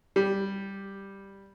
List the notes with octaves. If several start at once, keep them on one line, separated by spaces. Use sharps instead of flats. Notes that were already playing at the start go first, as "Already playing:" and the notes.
G3